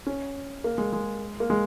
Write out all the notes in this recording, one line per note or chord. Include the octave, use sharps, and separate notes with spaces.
C#4
A#3
G#3
G#3
A#3
G#3